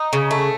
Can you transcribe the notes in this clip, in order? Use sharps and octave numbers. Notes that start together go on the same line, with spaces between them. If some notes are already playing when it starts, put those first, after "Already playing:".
Already playing: D#4
C#3
A3